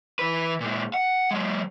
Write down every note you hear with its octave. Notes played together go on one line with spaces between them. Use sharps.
E3 B4
A#2 G#3
F#5
F#3 G#3